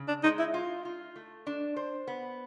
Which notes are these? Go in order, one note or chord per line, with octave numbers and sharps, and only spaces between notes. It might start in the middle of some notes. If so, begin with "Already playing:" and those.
Already playing: C#3
D4
G#3 D#4
E4
F4
F4
A3
D4
C5
B3